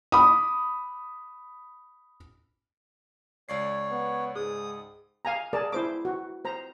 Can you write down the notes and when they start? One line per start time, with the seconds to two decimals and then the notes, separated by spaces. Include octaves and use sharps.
0.12 B5 D6 D#6
3.49 C#2 C#5 D5 C7
3.91 B3
4.36 G#2 G#4 D#6
5.25 F5 G#5 A#5
5.53 G#4 A#4 D5 A5
5.73 E4 C5 D6
6.05 F#4
6.45 C5 A#5